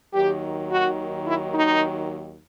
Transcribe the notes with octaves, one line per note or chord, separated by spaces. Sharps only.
D#2 D#3 F#3 G4
F#4
E4
D#4